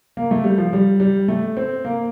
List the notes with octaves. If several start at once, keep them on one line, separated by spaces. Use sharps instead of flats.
A#3
A3
G3
F3
G3
G3
A3
C4
A#3